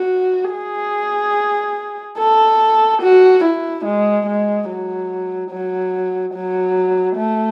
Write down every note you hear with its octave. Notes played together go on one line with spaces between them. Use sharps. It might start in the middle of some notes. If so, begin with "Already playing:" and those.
Already playing: F#4
G#4
A4
F#4
E4
G#3
G#3
F#3
F#3
F#3
A3